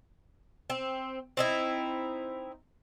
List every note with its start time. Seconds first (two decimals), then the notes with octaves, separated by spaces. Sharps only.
0.70 C4
1.37 C4 D#4 E4